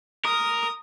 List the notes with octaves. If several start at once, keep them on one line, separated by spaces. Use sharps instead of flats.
A#4 D#6